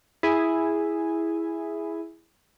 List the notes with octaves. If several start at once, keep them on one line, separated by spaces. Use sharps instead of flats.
E4 G#4 G#5